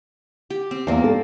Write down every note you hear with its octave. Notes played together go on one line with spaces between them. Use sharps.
G4
C4
E2 A#3 C5
A4